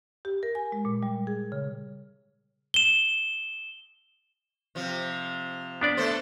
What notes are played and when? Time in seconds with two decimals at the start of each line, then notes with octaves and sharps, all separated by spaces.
0.25 G4
0.43 A#4
0.55 G#5
0.72 G#3
0.85 A#2
1.03 G3
1.27 G#4
1.52 C#3
2.74 E7 G7
4.75 C3 F3
5.81 B3 D4 D5
5.97 A3 A4 C5